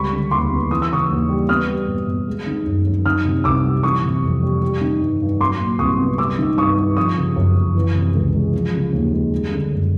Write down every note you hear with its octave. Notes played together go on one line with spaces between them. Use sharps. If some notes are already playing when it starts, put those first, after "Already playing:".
Already playing: C#2 G3 B5 C#6
D3
D#2 C6 D6
B3
E3 D#6
E6
C#3 C#6 D#6
D#2
G3
B3 D#6 F6
G3
B2
B2
G#3
D#3
F#2
F#2
D#3 D#6 F6
C3
C2 D6 E6
G3
E3 C#6 D#6
C3
F2
G3
G3
D#3
G2
G2
F#3 C6 D6
A#2
C2 C#6 D#6
B3
G3 D6 E6
D#3
G2 C#6 D#6
G2
F3 C#6 D#6
C#3
F#2
F#2
E3
C3
C#2
G#3
F3
C#3
D#2
G#3
G3
D3
F#2